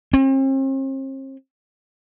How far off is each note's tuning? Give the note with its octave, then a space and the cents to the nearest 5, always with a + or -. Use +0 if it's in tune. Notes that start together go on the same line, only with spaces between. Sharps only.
C4 +45